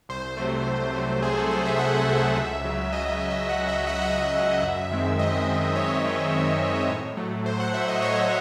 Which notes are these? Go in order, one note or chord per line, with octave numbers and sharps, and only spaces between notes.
C2 C5
C3 F#3 A3
C2
C3 F#3 A3
C2 G#4
A4
C3 F#3 A3 C5
E5
C2 F#5
E5
C3 F#3 A3
E5
C#2
C#3 F#3
C#2 D#5
C#3 F#3
E5
C#2 F#5
E5
C#3 F#3
F#5
E5
D#5
C#2 E5
C#3 F#3
F#2
D#3 G#3 C4
F#2 D#5
D#3 G#3 C4
F#2 C#5
D#3 G#3 C4
F#2
D#3 G#3 C4
A2
F#3 A3
A2 C5
F#5
F#3 A3 E5
D#5
A2 C#5